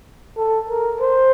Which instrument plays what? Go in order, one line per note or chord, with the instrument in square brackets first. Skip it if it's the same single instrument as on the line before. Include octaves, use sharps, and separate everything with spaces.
[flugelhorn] A4
A#4
C5